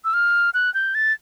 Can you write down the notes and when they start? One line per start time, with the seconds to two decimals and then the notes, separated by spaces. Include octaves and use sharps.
0.05 E6
0.13 F6
0.54 F#6
0.74 G6
0.95 A6